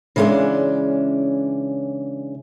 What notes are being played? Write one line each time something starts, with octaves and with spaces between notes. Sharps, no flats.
C#3 E3 G#3 B3 C#4 D4